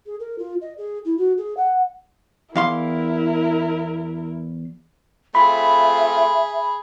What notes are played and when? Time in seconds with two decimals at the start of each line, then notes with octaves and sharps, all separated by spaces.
0.06 G#4
0.20 A#4
0.38 F4
0.61 D#5
0.78 G#4
1.05 E4
1.17 F#4
1.37 G#4
1.57 F#5
2.56 E2 E4 A#4 F5 C6
5.35 A3 C4 F4 G#4 E5 B5